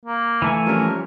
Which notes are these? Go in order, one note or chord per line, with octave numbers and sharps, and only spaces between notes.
A#3
E3 A3 G#5
F3 G3 C#4 A#4